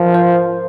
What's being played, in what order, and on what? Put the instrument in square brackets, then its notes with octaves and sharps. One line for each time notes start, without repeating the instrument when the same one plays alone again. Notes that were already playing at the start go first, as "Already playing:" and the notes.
Already playing: [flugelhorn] F3 [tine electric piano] A#4
[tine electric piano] C5